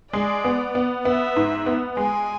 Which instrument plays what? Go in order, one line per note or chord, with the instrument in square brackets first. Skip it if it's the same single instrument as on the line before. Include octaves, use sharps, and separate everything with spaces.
[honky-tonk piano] G#3 [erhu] D5
[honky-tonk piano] B3
B3
[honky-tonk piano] B3 [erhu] E5
[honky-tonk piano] G#2
B3
[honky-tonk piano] G#3 [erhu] G#5